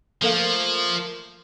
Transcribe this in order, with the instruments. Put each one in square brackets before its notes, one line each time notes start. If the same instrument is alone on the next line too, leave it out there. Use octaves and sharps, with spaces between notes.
[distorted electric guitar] F3 [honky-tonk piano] A3 A#3 F5